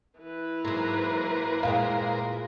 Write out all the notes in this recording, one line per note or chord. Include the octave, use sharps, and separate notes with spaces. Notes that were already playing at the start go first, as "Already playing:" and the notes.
E3 B4
G#2 F#3 A#3 A#4 C5
A#2 G#3 G4 F5